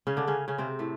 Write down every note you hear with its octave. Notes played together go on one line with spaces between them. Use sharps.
C#3 C#4
D3 D4
C#3 C#4
C#3 C#4
C3 C4
A2 A3